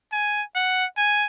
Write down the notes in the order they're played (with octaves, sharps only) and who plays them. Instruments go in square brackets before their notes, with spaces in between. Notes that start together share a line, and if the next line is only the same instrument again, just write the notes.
[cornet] G#5
F#5
G#5